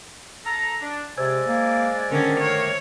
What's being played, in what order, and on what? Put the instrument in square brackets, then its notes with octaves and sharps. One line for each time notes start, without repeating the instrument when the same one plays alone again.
[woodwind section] A4 A#5
D4
[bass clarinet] C3 [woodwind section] G#3 D5 G#5 [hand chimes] C5 E6 G#6
[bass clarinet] A#3
[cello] D3 C#4 [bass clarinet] D#3
[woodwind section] A3 A#3 [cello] C#5